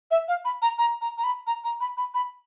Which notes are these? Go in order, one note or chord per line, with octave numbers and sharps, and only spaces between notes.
E5
F5
B5
A#5
A#5
A#5
A#5
B5
A#5
A#5
B5
B5
B5